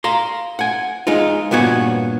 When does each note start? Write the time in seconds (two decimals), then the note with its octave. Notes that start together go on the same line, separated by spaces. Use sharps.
0.04 F5 A#5 C6
0.59 F#5 G#5
1.07 G#3 D#4 F4
1.51 G2 A#2 B3 F#4 C#5